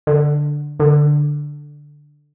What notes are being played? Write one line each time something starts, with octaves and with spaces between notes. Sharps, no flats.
D3
D3